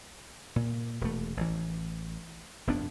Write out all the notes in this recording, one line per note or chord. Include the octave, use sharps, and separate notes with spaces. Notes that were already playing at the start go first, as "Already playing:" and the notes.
A#2
E1 A3
A1 E3
F1 G2 B3 D4